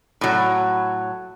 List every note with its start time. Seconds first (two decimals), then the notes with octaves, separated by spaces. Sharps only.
0.21 A2 F#3